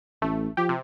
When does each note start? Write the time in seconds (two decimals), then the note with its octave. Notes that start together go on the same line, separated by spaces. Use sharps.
0.22 A1 A3
0.57 F3 G4
0.69 C3